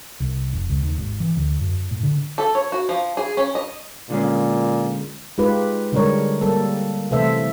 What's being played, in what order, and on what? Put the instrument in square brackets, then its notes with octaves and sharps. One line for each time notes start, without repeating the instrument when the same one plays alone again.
[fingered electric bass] C2
F1
C#2
D#2
G#1
E3
D2
F#2
A2
D3
[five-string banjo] A4
C#5
F#4
F3
G#4
C#4
D#5
[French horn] A#2 [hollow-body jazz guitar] D3 G#3 C#4
[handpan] G#3 D#4 F4 G4 B4
D3 G3 G#3 D4 A#4 C#5
G3 A#3 A4
C3 E3 A3 A4 C5 E5